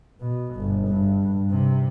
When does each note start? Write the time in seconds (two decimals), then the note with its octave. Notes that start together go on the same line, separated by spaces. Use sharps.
0.20 B2
0.55 G1
0.88 G2
1.51 C3